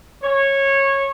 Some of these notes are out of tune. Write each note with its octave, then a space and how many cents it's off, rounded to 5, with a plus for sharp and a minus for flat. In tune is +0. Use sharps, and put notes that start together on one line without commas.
C#5 -15